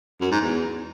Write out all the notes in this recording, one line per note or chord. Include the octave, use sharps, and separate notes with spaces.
F#2
G#2
E2